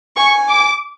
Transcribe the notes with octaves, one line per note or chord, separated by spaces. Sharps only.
G#5 C#6
D6